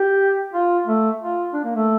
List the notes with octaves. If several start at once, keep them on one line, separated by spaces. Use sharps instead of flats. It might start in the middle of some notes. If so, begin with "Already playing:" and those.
Already playing: G4
F4
A3
F4
D4
A#3
A3